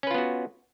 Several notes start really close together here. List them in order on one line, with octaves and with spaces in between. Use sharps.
C#4 B4 F4 B3 F#4